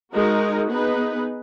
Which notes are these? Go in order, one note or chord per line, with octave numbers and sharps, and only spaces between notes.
G#3 D#4 F#4 A#4
B3 D#4 G#4 B4